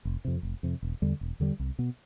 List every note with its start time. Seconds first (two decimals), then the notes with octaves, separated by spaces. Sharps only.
0.05 F1
0.25 F2 C3
0.43 F1
0.63 F2 C3
0.82 E1
1.02 E2 D3 G3
1.21 E1
1.40 E2 D3 G3
1.59 C2
1.79 B2 B3